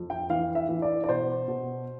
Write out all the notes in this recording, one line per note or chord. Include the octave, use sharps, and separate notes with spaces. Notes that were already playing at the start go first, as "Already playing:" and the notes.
Already playing: F2
G5
E3 F5
E5
E3
D5
D5
B2 C5
B2